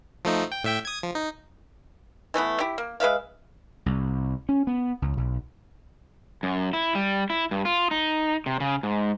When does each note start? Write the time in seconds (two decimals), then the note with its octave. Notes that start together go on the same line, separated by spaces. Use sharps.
0.25 F3 A3 D#4
0.52 G5
0.64 A2 E5 G5
0.85 D#6 G#6
1.03 F3
1.15 D#4
2.34 E3 A3 B3 E4
2.60 E4 G4
2.78 A#3
3.00 G#3 B4 E5 F5
3.86 C2
4.49 C#4
4.67 B3
5.02 C#2
5.17 B1
6.43 F#2
6.73 E4
6.95 G3
7.30 E4
7.51 G2
7.65 F4
7.91 D#4
8.46 C3
8.60 C#3
8.83 G#2